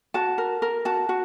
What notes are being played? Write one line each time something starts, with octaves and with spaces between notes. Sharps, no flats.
F#4 A5
A#4
A#4
F#4 A5
F#4